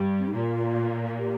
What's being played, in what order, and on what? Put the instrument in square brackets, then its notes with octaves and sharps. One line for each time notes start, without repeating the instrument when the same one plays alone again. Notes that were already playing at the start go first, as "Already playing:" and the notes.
Already playing: [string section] G2 G3
[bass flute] C4
D#4
[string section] A#2 A#3 [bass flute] F4
[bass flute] G4